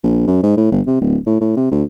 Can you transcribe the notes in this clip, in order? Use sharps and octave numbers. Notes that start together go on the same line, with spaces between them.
A#1
F#2
G#2
A2
G1
C3
D1
A2
A2
C3
D2